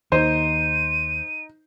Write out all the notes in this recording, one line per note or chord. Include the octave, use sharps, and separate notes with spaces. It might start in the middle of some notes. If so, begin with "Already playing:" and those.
D#2 D#4 C5 D#7